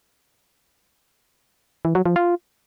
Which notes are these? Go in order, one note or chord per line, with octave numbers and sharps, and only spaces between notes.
E3
F#3
F3
F4